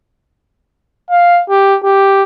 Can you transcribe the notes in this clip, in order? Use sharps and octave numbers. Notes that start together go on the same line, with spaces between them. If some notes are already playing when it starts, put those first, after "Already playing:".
F5
G4
G4